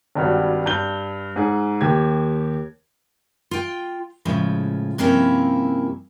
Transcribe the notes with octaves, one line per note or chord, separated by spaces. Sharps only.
G#1 G2 G3 F#4
G2 G6 G7
G#2 G#4
D#2 G4 G#6
F4 G5
A2 C#3 F3 G#3
G2 C3 F3 A#3 C#4 E4